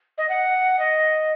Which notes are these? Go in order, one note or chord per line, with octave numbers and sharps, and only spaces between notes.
D#5
F#5
D#5